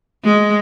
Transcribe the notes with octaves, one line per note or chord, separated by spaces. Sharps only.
G#3